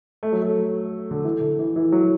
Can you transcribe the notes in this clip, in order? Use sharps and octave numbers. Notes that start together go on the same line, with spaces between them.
A3
F#3
A3
D3
E3
D3
E3
E3
F#3